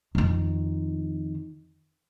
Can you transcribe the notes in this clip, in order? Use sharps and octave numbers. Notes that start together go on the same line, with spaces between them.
F2 D#3